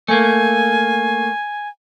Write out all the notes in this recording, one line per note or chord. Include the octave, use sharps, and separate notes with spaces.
A3 A#3 G#5